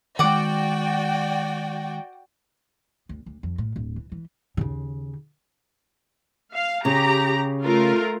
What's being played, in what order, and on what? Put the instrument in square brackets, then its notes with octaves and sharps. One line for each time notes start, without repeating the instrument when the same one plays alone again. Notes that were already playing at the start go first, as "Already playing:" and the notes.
[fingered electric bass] D#3 G#3 [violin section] F#4 D5 G5 [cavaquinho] F#5 D6
[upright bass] D2
D2
F2
A2
D1
E3
E3
D#2 C#3
[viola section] F5
[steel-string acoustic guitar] C#3 [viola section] G4 A#5
[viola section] A3 F4 A#4